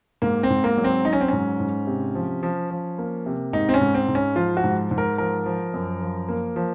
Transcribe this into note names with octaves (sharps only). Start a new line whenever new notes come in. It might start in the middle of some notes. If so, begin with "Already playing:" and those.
G#2 A#3
C4
G#2
A#3
F#3
C4
F#3 D#4
C#4
C4
G#2 C#4
G#2
C3
F3
F3
F3
A#3
C3
G#2 D#4
C4
C#4
G#2
C4
G#2
C#4
F3 F4
F#4
G#2
G#2
A#4
F3 A#4
F3
F#2
F3
A#3
F3